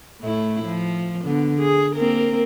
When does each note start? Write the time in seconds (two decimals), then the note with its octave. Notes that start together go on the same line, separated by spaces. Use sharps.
0.21 A2 A3 E4
0.66 F3
1.24 D3 B3
1.60 G#4
1.96 A#3 C4 A#4